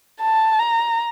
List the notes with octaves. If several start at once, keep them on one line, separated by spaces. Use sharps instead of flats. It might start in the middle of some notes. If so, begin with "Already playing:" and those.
A5
A#5